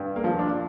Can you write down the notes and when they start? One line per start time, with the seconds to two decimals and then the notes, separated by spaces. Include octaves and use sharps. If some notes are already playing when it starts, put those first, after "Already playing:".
Already playing: G2
0.16 A#3
0.24 F3
0.39 D4